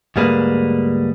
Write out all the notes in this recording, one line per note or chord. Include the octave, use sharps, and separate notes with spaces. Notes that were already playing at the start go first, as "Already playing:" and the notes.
D2 G#2 G3 A#3 G#4 B4